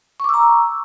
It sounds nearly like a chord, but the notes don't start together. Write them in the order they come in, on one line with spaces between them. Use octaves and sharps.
C#6 D6 E6 A#5